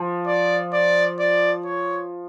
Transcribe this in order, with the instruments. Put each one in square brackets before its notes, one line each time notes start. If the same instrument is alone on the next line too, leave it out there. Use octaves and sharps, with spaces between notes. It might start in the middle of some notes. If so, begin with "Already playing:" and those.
Already playing: [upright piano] F3
[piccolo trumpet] D5
D5
D5
C#5